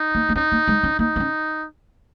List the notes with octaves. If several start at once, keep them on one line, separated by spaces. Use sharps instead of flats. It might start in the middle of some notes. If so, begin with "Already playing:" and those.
Already playing: D#4
A#3
A#3
C#4 D#4
A#3
G#3
C#4
A#3 D#4
A#3
C#4